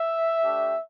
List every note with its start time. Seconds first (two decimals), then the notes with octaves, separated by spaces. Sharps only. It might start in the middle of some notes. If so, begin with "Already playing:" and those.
Already playing: E5
0.44 A3 D4 G4